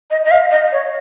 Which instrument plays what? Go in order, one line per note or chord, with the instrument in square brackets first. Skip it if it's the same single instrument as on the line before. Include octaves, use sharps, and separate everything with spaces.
[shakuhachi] D#5
D#5
F5
D#5
C#5